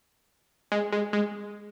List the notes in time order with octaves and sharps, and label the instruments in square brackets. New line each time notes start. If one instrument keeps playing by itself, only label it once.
[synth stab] G#3
G#3
G#3